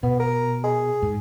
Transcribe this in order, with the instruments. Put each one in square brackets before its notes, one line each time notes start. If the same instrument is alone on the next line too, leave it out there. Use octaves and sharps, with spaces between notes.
[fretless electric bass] B2 [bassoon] B3
[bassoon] A#4
G#4
[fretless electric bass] G#2